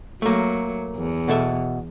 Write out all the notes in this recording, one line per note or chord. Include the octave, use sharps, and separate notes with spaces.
F#3 A3 A#3
E2
B2 A4 E5